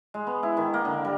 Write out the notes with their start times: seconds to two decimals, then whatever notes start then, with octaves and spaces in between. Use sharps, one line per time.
0.14 G#3
0.27 B3
0.43 E4
0.57 D#3
0.74 A#3
0.85 D3
1.05 G3